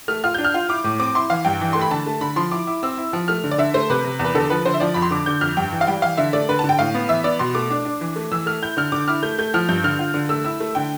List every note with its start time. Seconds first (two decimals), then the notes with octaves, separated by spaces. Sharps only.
0.08 A3 F6
0.24 F4 F6
0.34 D4 G6
0.44 F6
0.54 F4
0.69 E4 D6
0.84 A2
1.00 C4 D6
1.15 E4 C6
1.30 E3 F5
1.45 G2 G5
1.61 E3
1.73 A3 C6
1.81 B5
1.91 D3 A5
2.06 A3
2.21 D3 B5
2.36 F3 C6
2.51 E4 D6
2.67 E4
2.83 C4 E6
2.98 E4
3.13 F3
3.28 A3 F6
3.44 D3
3.51 D5
3.58 D3 E5
3.74 A3 C5
3.90 C3 B4
4.04 C3
4.19 E2
4.25 B4
4.34 D3 A4
4.50 F3 B4
4.65 D3 C5
4.74 E5
4.80 F3 D5
4.94 F2 B5
5.02 C6
5.11 D3 D6
5.26 D3 G6
5.41 F2 F6
5.57 G2 G5
5.72 E3
5.81 F5
5.87 G3 G5
6.02 E3 F5
6.17 D3 E5
6.33 A3 D5
6.49 D3 B4
6.59 D3 A5
6.69 G5
6.79 A2 F5
6.95 B3
7.09 E3 E5
7.24 B3 D5
7.39 B2 C6
7.55 A3 D6
7.70 D4
7.85 D4
8.01 E3
8.16 A3
8.32 E3 E6
8.46 A3 F6
8.62 E4 G6
8.77 D3 F6
8.92 D3 D6
9.08 E4 F6
9.23 A3 G6
9.38 A3 G6
9.54 F3 F6
9.69 G2 G6
9.84 D3 F6
9.99 F4
10.14 D3
10.29 A3 E6
10.45 E4 E6
10.60 A3
10.75 D3 G5